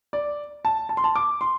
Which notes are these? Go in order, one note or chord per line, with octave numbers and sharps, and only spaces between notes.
D5
A5
A5
C6
A5
D6
C6